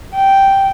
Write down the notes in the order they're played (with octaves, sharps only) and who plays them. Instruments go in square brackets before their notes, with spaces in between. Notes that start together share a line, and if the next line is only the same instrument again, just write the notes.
[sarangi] G5